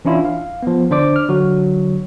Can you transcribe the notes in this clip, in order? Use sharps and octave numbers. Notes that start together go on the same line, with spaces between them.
E3 C#4 D4 E4 F4
F5
F3 B3
D3 D4 C5 D5 D6
F6
D3 F#3 F#4